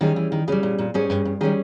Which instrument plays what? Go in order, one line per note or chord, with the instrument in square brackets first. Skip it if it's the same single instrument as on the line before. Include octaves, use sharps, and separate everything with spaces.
[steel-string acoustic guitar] D#3 [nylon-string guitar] G3 C#4 G#4
[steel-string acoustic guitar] E3
D#3
[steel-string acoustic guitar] C#3 [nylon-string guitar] G3 C#4 G#4
[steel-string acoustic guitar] A#2
A#2
[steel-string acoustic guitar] G#2 [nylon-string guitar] G3 C#4 G#4
[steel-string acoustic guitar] G2
G2
[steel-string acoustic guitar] D#3 [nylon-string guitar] G3 C#4 G#4